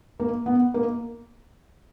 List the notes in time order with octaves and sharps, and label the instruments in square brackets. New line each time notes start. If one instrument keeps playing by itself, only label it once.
[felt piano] A#3
B3
A#3